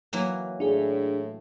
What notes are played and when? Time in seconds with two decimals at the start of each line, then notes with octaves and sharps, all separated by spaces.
0.13 E3 F#3 A#3
0.60 A2 D4 G#4